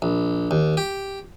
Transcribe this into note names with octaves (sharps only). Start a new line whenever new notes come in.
A#1
D#2
G4